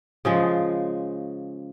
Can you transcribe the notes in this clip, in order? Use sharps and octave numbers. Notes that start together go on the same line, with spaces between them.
C#3 F3 G#3